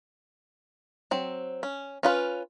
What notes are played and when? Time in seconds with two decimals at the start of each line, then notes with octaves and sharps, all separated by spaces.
1.11 F#3 C4
1.63 C#4
2.03 C#4 F4 B4